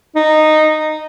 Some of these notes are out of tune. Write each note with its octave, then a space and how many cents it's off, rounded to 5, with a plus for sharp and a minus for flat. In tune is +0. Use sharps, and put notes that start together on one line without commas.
D#4 -10